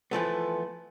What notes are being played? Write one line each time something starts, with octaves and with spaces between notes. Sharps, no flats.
E3 F3 A3 B3